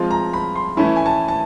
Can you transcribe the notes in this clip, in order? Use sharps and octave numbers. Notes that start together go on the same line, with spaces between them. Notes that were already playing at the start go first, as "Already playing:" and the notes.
Already playing: F3 G#3 C4 F4
A#5
B5
C6
E3 A3 C#4 E4 B5
G#5
A5
A5